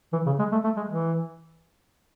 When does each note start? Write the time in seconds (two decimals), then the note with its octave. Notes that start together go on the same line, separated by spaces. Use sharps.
0.13 E3
0.26 C#3
0.39 G#3
0.52 A3
0.64 A3
0.76 G#3
0.89 E3